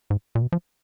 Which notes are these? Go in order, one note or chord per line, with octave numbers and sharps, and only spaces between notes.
G#2
A#2
B2
F3